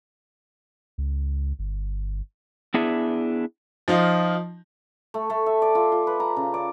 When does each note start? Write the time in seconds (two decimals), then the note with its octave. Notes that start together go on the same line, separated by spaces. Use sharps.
0.98 C#2
1.59 G1
2.74 B3 D4 E4 G#4 E5
3.88 F3 D#4 F4
5.14 A3
5.30 A3
5.46 E5
5.62 D5
5.75 F4
5.92 F4
6.07 B4
6.20 A#5
6.36 C#3
6.54 D5